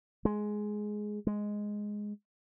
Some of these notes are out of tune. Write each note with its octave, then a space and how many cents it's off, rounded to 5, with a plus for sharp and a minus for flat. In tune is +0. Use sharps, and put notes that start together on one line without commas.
G#3 +10
G#3 +0